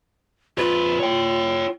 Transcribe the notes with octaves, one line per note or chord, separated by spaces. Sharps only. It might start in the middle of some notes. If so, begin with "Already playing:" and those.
F2 F4 B4
C#5 G5